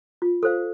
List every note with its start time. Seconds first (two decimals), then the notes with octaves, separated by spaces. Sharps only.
0.22 F4
0.43 A4 C5 F5